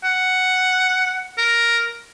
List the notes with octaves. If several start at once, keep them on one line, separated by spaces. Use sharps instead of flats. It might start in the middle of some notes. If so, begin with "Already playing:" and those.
F#5
A#4